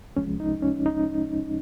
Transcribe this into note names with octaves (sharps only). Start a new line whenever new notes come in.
C2 C3 F3 G#3 C#4
D#4
C#4
D#4